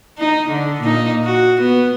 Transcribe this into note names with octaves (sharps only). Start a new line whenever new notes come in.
D#4
D3
A#2 D#4
F#4
B3